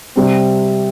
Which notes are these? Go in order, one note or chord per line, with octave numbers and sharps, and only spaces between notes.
C3 G3 C4